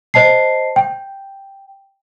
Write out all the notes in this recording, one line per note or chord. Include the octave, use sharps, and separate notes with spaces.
C5 D#5 A5 C7
G5